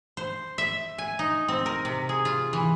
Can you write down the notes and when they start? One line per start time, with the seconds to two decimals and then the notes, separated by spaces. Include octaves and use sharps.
0.17 C5
0.58 E5
0.98 G#5
1.19 D#4
1.48 C4
1.66 A#4
1.85 C3
2.09 G#4
2.25 F4
2.53 E3